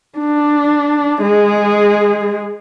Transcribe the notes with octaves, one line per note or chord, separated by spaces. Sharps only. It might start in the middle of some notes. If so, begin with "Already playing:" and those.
D4
G#3 G#4